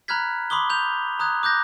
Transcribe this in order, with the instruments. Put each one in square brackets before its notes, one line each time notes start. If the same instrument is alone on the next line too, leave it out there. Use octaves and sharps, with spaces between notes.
[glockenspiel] A#5 B5 F6 F#6 G#6 B6
B5 C6 D6 D#6 G7
G6 F7
A#5 D#6 F#6 G#6
D6 F#6 G6 A#6